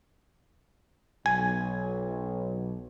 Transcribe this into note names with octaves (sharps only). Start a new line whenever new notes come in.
B1 G#5